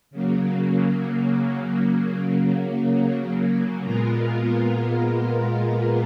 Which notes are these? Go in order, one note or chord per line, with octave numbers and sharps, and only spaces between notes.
C#3 F#3 A#3
A#2 G#3 B3 F4 A#4